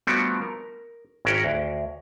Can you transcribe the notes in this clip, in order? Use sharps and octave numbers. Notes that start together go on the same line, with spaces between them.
F3 G3 A3 B3 D4 F#4
A#4
G#1 C#4 A#4 E5 F#5 G5
D2